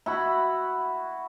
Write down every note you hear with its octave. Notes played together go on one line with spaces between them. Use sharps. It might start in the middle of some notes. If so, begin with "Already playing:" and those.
E4 F#4 B5